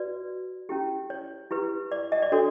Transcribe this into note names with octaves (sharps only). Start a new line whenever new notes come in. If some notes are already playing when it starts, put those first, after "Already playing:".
Already playing: F#4 B4 D5
C#4 E4 G4
C#5
E4 G4 B4
D5
D#5
D5
D4 F#4 A4 C#5